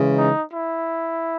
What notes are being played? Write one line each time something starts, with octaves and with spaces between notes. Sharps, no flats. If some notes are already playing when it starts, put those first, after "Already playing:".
Already playing: C#3 E3 G#3
D#4
E4